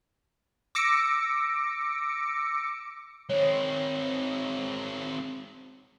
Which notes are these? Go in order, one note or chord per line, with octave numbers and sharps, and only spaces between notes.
D6 E6 A#6 C#7 D7
G#3 C4 C#5